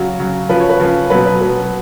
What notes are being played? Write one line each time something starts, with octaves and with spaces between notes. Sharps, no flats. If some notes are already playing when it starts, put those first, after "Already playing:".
Already playing: C#3 F#3 F#4
C#3 F#3
C#3 F3 B4
C#5
B4
C#3 F3
B2 F#3 B4
B4
B2 F#3 B4